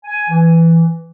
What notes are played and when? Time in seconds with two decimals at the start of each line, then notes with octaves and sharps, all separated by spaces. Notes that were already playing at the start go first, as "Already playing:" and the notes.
0.04 G#5
0.29 E3